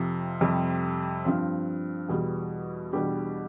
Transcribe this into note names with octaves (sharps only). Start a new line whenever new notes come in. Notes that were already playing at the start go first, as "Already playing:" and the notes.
Already playing: F2 C3 F3
F2 C3 G3
G2 F3 C4
E2 B2 G3
E2 B2 G3 D4 G4